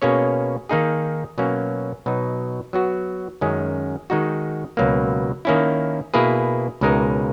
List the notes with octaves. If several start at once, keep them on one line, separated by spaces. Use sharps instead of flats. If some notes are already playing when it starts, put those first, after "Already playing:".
B2 A#3 C#4 G#4 C#5
D#3 A#3 D#4 G#4
B2 F#3 A#3 C#4
B2 F#3 B3 D#4
F#3 B3 F#4
F#2 D#3 G#3 C#4
D#3 G#3 D#4 F#4
C#2 B2 F#3 A#3
D#3 A#3 C#4 E4
B2 A#3 E4 G#4 B4
C#2 B2 G#3 D#4 A#4